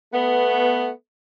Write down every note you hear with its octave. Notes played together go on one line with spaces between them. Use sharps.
A3 B3